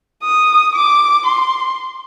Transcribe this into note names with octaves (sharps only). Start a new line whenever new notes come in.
D#6
D6
C6